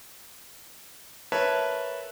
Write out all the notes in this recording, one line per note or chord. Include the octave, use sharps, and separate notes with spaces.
A#4 B4 C#5 E5 A5